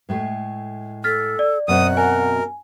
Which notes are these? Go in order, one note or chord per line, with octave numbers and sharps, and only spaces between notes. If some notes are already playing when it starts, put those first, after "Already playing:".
A2 G#3 A3
A4 F6 A6 B6
D5
F#2 B2 C4 F#5 D#6
A#4 G#5